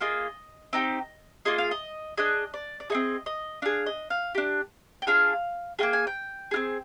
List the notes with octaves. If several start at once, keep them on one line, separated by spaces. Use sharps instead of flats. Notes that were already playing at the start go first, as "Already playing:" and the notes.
A#3 F4 G#4 D#5
C4 D#4 G4
A#3 F4 G#4 D#5
F5
D#5
D4 G#4 D#5
D5
D5
C4 D#4 G#4 D#5
D#5
D4 G#4 F5
D#5
F5
D4 G4
G5
D4 F4 G#4 F5
A#3 F4 G#4 G5
G#5
G5
C4 F4 G#4